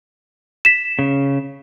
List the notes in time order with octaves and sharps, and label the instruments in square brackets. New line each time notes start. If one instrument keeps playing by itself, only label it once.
[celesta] B6 E7
[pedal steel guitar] C#3